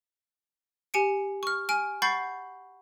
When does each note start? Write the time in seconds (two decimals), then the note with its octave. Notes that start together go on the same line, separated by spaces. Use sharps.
0.94 G4 G#5 C#7 D7
1.43 C#6 F6
1.69 G#5 F6 D7
2.02 F#5 B5 C#6 G6 A6 C7